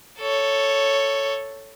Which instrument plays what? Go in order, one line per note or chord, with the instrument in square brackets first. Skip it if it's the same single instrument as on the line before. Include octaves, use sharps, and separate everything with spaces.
[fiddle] A4 C#5